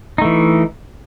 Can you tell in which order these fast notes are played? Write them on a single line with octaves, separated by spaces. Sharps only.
D#4 A3 E3